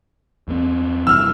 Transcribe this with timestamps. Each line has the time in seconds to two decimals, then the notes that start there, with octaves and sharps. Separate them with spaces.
0.48 E2 A#3 C4
1.07 F1 G2 E3 E6 F6